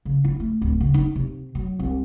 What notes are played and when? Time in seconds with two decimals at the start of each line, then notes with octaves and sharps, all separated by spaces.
0.05 C#3
0.24 E4
0.40 A3
0.61 D1
0.80 C#3
0.94 D#4
1.16 C3
1.55 F#3
1.79 C2